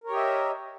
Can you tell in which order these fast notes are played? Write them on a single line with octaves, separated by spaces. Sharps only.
A#4 C#5 G4 D#5 E5